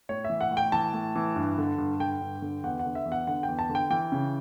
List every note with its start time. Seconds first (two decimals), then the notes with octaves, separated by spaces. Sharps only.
0.09 A2 C#5
0.24 E5
0.30 E3
0.41 F#5
0.51 A2
0.57 G5
0.72 E3 A5
0.93 A2
1.16 E3
1.36 G2
1.58 D3
1.78 G2
2.00 D3 G5
2.21 G2
2.42 D3
2.64 E2 F#5
2.79 F#5
2.85 D3
2.95 E5
3.06 E2
3.12 F#5
3.27 D3 F#5
3.43 G5
3.48 E2
3.59 A5
3.69 D3
3.75 G5
3.90 E3 G5
4.12 C#3